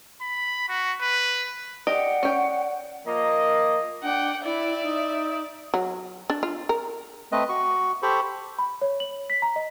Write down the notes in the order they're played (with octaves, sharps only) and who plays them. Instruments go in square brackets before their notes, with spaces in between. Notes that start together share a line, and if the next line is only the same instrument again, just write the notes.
[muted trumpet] B5
F#4
B4
[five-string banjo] G4 D#5 [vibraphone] D5 [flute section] F#5
[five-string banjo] C#4 G5
[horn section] F3 A#3 A#4 D#5
[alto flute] D4 [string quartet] F#5 G5
[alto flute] E4 [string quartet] D5 E5
[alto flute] D#4
[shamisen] F#3
D4
F4
A#4
[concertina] A3 C4 B4 D#5
F#4 C#6
G4 A4 C5 B5 C#6
[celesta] B5
C#5
F#7
B6
A#5
D#5